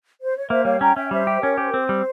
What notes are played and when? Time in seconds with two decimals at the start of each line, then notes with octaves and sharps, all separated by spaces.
0.22 C5
0.36 C#5
0.50 A#3 C5 E5
0.65 G3 C#5 F5
0.80 C#4 G5 A#5
0.96 C#4 E5 G5
1.11 G3 C5 E5
1.27 G4
1.42 C#4 A#4 C#5
1.58 G4 C5
1.67 A#4
1.73 C4 C5
1.89 G3